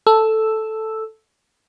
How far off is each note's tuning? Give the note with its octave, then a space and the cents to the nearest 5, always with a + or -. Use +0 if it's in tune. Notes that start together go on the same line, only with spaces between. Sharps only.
A4 +0 E6 +0